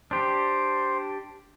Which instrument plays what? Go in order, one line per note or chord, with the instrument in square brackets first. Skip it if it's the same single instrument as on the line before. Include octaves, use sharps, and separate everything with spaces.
[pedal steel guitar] D4 G4 [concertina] C5